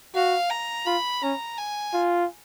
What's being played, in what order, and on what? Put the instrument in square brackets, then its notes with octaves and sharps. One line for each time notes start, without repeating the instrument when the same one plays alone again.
[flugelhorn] F#4 [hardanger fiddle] F5
[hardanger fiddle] A#5
[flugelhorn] F4 [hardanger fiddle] B5
[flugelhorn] C#4 [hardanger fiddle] A#5
[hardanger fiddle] G#5
[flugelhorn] F4